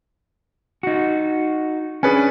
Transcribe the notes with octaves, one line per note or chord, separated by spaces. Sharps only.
D#4 F#4
C#4 D4 G#4 B4 G#5